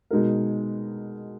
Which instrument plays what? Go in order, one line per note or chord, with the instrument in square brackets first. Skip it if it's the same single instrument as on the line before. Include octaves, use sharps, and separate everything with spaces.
[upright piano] B2 G#3 D#4 A#4